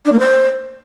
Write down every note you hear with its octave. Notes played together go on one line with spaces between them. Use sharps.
D4
A#3
C5